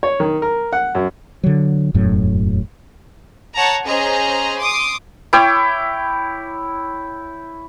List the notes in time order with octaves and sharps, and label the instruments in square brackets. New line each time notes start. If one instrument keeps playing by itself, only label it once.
[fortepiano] C#5
D#3
A#4
F#5
F#2
[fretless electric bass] D3 F#3
E1 F#2 A2 F#3
[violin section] C#5 F#5 A5 A#5
C#4 G#4 C5 D#5 A#5
C6 D6 D#6
[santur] E4 C#5 G5 D6